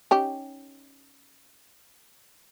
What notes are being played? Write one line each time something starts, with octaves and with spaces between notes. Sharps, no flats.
C#4 D#4 G4